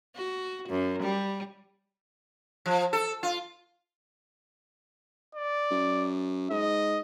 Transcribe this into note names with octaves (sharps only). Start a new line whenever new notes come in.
F#4
F#2
G3
F3
A4
F4
D5
F#2
G#2 D#5